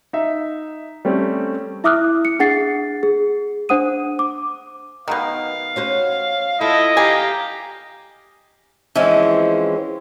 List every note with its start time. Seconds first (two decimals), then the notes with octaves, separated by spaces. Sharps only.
0.13 D#4 E5
1.05 G3 A3 C4 C#4
1.84 E4 E5 D6 D#6 F6 F#6
2.25 C#7
2.39 D4 G#4 F#5 A6 C7
3.03 G#4
3.69 D4 C5 F#5 D#6 D#7
4.19 D6
5.08 B2 D#3 B3 D#4 F5
5.76 C#4 F#4 C5
6.61 E4 F4 A4 D#5
6.97 G4 F5 G#5 A#5
8.95 E3 F3 G#3 C4 C#4